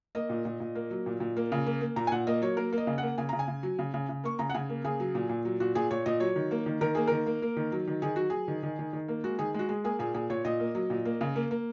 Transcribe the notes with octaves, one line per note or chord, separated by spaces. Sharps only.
A#3 D#5
A#2
A#2
A#2
A#3
F#3
A#2
A#2
A#3
C#3
A#3
A#3
A#2 A#5
G#5
A#2 F#5
A#3 D#5
F#3 C#5
A#3 A#4
A#3 D#5
C#3
A#3 F#5
C#3 G#5
C#3 A#5
G#5
C#3
F#3
C#3
C#3
C#3
A#3 C#6
C#3 A#5
F#5
C#3 G#5
A#3
C#3 G#4
F#3
A#2
A#2
F#3
A#2 F#4
A#2 G#4
A#2 C#5
A#2 D#5
F#3 C#5
D#3
A#3
D#3
D#3 A#4
A#3 G#4
D#3 A#4
A#3
A#3
D#3
F#3
D#3
D#3 G#4
F#3 F#4
F#3 G#4
D#3
D#3
D#3
D#3
A#3
G#3 F#4
D#3 G#4
G#3 F#4
G#3 G#4
A#3 G#4
A#2 G#4
A#2 G#4
A#2 C#5
A#2 D#5
A#3
F#3
A#2
A#3
C#3
A#3
A#3